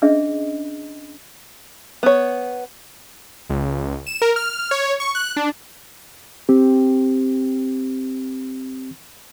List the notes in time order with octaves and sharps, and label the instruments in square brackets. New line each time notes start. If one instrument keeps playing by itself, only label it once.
[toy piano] C#4 D4 G#4 D#5 E5
[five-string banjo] B3 C#5
[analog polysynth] C#2
E7
A#4
F6
C#5
C#6
F#6
D4
[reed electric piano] C4 G4